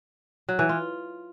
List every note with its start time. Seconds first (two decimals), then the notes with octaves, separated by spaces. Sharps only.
0.49 F#3
0.59 E3
0.69 F4